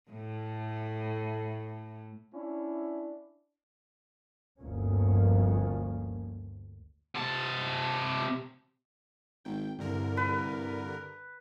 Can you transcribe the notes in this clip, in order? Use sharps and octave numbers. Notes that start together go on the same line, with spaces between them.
A2 A3
C#4 D4 E4
G1 D2 F3 A#3 C#4
C3 A5
G#1 G5
C2 G2 D3 A#4
B4